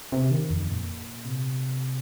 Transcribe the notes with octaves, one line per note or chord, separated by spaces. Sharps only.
C3
D#3
F2
A#2
C3